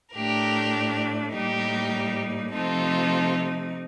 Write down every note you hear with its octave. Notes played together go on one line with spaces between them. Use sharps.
A2 A3 D4 G4 A#4
A2 G3 A#3 D#4 G4 A#4
C3 F3 A3 C4 D#4 F4 A4